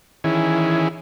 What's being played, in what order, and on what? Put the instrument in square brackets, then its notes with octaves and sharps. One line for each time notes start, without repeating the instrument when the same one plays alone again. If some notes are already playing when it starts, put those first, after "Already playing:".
[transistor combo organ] D#3 E3 C#4 E4 G#4